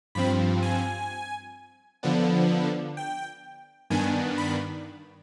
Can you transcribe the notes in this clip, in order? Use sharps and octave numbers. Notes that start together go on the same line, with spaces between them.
G2 F3 C4 B5
G#5
D3 F3 B3 D4
G5
G2 D#3 B3 D4 G#5
B5